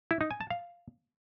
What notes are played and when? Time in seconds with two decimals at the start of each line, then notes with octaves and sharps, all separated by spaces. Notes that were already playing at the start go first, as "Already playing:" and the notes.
0.11 E4
0.21 D#4
0.31 G#5
0.41 A5
0.50 F5